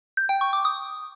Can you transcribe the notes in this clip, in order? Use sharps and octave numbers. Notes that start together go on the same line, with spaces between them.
G6
G5
C#6
D6
D#6